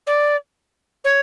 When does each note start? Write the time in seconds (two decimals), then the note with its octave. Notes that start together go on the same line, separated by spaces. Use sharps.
0.06 D5
1.04 C#5